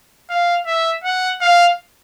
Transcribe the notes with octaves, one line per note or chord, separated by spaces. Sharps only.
F5
E5
F#5
F5